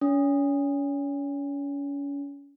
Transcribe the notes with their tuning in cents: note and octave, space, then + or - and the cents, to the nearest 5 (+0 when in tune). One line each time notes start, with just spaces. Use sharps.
C#4 +35